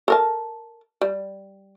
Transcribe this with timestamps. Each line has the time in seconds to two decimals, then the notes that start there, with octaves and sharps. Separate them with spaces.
0.08 A4 A#4 A5
1.01 G3